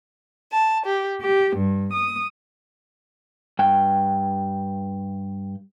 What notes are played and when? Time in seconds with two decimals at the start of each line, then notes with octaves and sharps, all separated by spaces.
0.51 A5
0.85 G4
1.21 G4
1.56 G2
1.92 D#6
3.59 G2 G5